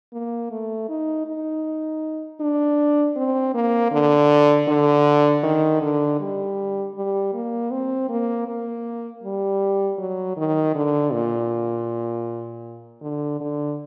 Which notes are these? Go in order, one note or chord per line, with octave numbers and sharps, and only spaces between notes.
A#3
A3
D#4
D#4
D4
C4
A#3
D3
D3
D#3
D3
G3
G3
A#3
C4
A#3
A#3
G3
F#3
D#3
D3
A#2
D3
D3